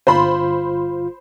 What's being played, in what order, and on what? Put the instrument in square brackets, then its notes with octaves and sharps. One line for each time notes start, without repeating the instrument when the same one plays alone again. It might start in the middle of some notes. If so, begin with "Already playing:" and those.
[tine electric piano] G1 F4 [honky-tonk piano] C5 B5